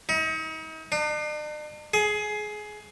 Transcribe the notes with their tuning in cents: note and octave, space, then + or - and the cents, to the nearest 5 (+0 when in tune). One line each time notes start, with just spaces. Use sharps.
D#4 +40
D4 +45
G#4 +20